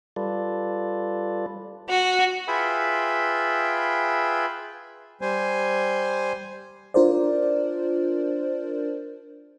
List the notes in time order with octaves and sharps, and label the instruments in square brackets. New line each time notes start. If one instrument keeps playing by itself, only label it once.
[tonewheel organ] G3 F4 A4 B4 D5
[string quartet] F#4
[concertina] F4 G#4 B4 E5 G5 B5
[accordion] G3 C5 G#5
[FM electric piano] D4 F4 A#4 C5 D5